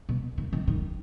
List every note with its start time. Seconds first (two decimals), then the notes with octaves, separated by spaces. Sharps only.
0.09 B2
0.38 D#3
0.53 D#3
0.67 D#3